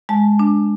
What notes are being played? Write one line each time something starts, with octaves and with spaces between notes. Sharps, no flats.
G#3 A5
D4